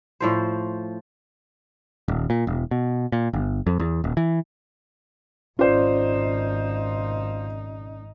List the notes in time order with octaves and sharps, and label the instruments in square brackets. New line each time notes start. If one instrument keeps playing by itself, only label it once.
[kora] A2 F3 C5
[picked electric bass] D#1
A#2
E1
B2
A#2
G1
F2
E2
D#1
E3
[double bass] G#1 D#4 [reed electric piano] C#4 D5 [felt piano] F4 C5